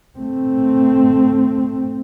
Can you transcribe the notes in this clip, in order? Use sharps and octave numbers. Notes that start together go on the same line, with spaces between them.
A3 C4